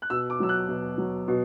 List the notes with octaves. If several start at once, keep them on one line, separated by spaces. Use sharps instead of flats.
F#6
B2 E6
D6
F#3 E6
F#6
B2
F#3
B2